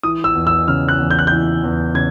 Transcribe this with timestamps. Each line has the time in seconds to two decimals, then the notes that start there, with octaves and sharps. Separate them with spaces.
0.03 E3 D#6
0.24 E6
0.35 E2
0.47 E6
0.68 C#3 F6
0.89 F#6
0.99 E2
1.11 G6
1.19 F#6
1.27 E3 G6
1.64 E2
1.95 C#3 G#6